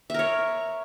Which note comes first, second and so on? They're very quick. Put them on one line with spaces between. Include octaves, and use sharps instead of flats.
E5 A#4 C#5